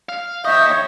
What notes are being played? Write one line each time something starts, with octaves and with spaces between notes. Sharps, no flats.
F5
D#2 D#5 E5 C#6 G6
C#5